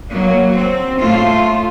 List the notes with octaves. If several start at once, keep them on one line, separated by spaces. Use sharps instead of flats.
F#3 A#3
C4
A2 A3 F4